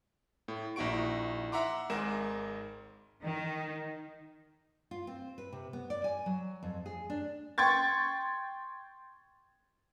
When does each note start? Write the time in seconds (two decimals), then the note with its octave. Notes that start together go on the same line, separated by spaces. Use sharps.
0.48 A2
0.76 A#1 D#4 E4 F#4 C#6 D7
1.52 E5 F#5 A#5 C6 D6
1.90 G#1 G#2 G#4 A#4 D6 E7
3.23 D#3
4.91 F4
5.07 C4
5.38 B4
5.52 C3
5.73 B3
5.90 D5
6.04 G#5
6.26 F#3
6.63 F2
6.86 G#4
7.10 D4
7.58 G5 C6 C#6 G#6 A6